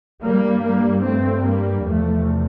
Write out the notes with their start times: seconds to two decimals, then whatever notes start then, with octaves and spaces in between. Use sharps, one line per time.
0.22 G2 G3 A#3
0.63 G3 A#3
1.04 A3 C4
1.45 G3 A#3
1.86 E2 C3 F3 A3